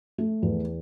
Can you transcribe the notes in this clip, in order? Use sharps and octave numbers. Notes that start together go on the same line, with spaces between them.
A3
E2